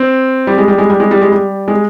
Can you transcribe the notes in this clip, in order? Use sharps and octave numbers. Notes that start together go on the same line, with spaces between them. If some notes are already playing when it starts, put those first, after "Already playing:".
Already playing: C4
G3
G#3
G3
G#3
G3
G#3
G3
G#3
G3
G#3